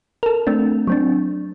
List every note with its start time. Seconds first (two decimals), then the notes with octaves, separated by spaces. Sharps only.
0.23 A4 A#4
0.47 A3 C4 D4
0.88 F#3 C4 D4